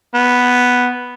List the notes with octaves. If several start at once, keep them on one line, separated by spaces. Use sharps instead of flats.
B3